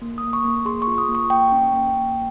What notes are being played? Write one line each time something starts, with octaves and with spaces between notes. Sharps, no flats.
A#3
D#6
A#3
C#6
A#3
G#4 C6
C#6
F4
D#6
A#3
C#6
A#3 G5
C#4
A#3
A#3